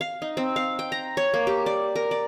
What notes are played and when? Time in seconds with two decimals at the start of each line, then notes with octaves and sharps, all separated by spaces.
0.01 F5
0.22 D#4
0.37 C4
0.56 F5
0.79 G5
0.92 A#5
1.17 C#5
1.34 A#3
1.47 G4
1.66 D5
1.96 A#4
2.11 D5